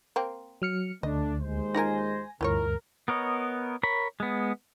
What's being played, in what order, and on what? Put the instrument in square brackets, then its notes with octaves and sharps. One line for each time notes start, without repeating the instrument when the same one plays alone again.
[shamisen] A#3 C4
[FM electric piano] F#3 F6 C#7
[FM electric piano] D2 [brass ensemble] A3 D4 [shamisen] D#5
[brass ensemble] D#2 G#3 C5
[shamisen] D#4 F4 A#4 [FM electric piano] G#5 A#6
[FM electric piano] D2 G2 [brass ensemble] C3 A#4 [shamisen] E4 F4 C#5
[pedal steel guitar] B3 A#4 C#5 D#5
A#4 C#5 B5
G#3 B3